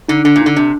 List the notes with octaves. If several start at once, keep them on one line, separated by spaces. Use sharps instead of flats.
D3 D#4
D3 D4
A#2
D#4
D3
C3 D4